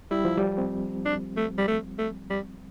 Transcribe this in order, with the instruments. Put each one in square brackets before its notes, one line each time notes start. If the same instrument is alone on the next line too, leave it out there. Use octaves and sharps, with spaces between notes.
[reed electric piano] G3 [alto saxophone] E4
[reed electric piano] F3
G3
C4
[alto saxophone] D4
A3
G3
A3
A3
G3